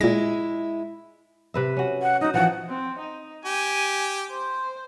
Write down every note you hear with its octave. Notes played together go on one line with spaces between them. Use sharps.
A#2 G#3 E4 A#6
C3 B4 E5
C#4 F#4
F#5
D#4 F#4 D#5
E3 F3 F#4 F#5
C4
D#4
G4 G#5
C5